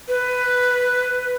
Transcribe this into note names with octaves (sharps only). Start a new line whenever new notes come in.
B4